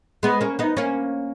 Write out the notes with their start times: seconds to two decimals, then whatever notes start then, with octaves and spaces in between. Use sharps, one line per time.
0.23 G#3 B3
0.41 A#3 C#4
0.59 B3 D#4
0.77 A#3 C#4